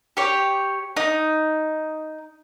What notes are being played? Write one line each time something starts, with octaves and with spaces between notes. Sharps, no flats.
G4 C#5
D#4